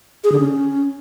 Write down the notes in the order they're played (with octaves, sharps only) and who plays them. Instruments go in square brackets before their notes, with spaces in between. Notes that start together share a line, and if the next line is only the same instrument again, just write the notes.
[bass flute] G#4
D3
C#4